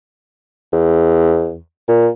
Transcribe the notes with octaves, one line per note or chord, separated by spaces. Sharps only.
E2
A#2